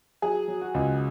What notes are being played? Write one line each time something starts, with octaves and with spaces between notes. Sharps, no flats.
F#3 G#4
F#3
F#4
C#2